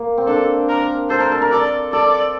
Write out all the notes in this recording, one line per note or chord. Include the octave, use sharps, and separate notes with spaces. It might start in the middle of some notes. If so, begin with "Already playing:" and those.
Already playing: A#3
C4
D4 A4
A#4
A4 C5
A#4
A4
A#4
A4 D5
A4 D5